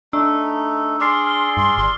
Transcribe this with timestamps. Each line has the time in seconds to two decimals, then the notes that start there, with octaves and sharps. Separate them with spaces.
0.13 A3 D4 D#4 E6
1.00 G#4 D5 C6 D6 F6 C7
1.27 F6 G7
1.57 G2 C6
1.78 G1 C6